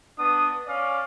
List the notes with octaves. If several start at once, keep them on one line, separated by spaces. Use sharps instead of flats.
B3 D4 D#6
C#4 D5 F5